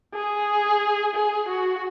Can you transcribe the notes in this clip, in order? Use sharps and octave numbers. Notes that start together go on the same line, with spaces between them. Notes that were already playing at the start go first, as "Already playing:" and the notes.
G#4
G#4
F#4